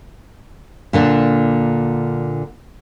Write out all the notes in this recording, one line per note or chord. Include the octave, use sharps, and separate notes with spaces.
A#2 D3 D4